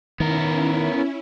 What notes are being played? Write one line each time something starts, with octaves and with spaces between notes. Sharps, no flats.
D#3 B3 C#4 E4 A#4